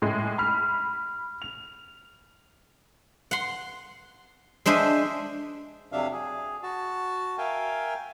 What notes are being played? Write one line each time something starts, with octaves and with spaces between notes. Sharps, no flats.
A2 G#3
B5 F6
F7
F#5 C6
G#3 D4 C5 D#5 E5
F2 C3 F#3 D4 E5 F5
G#4
F#4 A5
A#4 E5 F5 G5 G#5